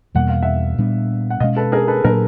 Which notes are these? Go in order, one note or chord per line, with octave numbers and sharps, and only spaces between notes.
E2 B2 G3 A#3 F#5
F5
E5 F#5
A#2 G3 B3 D4
F#5
B2 G#3 C#4 D#5 F5
A4 B4
G#4 A#4
A4 B4
A#2 F#3 A#3 D4 G#4 A#4